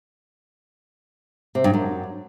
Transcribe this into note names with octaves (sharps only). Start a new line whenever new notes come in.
C3
G2
F#2